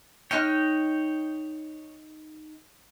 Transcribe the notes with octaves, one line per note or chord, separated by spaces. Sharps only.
D#4 C#5 G5 F6 F#6